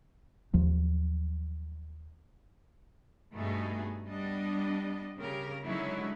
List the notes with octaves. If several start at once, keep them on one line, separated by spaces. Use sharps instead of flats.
D#2 F3 F#3
G2 B2 A3 B3 D#4 G#4
G3 B3 D4 D#5
C#3 G4 A#4
D3 F#3 G#3 C#4 D#4 E4